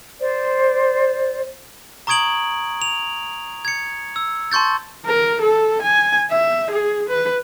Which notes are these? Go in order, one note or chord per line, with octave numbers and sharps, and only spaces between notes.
C5 D5
A#5 C#6 D#6 G#6 D7 F#7
F7
G#6 C#7
E6
A5 C6 C#6 G6 A6
A#4
A4
G#5
E5
G#4
B4